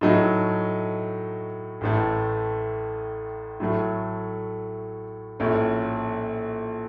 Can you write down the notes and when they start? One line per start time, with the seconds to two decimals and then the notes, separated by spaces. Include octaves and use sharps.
0.01 A2 F#3 A3 D#4
1.81 A1 A2 A3
3.60 A2 F#3 A3
5.40 A#1 A2 A3 C#4